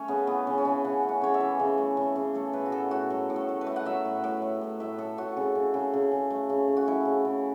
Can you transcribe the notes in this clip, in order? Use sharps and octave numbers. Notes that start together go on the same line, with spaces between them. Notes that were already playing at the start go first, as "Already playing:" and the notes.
Already playing: A3 C#4
C#3 B3
E3 B3
C#3 C#4
C#4
C#3 E4
C#3 F#5
A3
F#5
C#3 C#5
E5
E3
C#3
A3
C#3
C#3
A3 A4
A2 B4
F#4
A2 A4
A2 F#4
F#3 A4
A2
A4
A3
B4
A3
F#5
F#3 E5
A2
A2
A3
A2
A2 E5
A3 A4
A2 F#4
C#3
C#3
C#3
C#3
C#3
A3
C#3
C#3
F#4
A3 E4
C#3
C#3